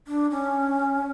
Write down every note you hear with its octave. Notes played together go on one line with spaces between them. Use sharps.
D4
C#4